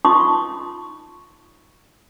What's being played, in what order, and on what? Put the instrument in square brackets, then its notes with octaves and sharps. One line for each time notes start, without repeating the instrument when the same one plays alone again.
[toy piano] D#4 F4 A5 C6 C#6 D#6